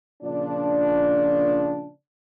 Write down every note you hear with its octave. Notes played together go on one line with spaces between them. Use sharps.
A#2 C#3 F3 D4